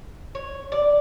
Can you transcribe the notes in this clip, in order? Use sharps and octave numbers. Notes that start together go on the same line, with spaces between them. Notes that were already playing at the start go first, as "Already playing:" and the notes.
C#5
D5